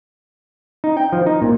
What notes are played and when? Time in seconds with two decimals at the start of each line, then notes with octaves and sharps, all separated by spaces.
0.84 D#4
0.97 G5
1.13 F3
1.26 D#4
1.42 A#2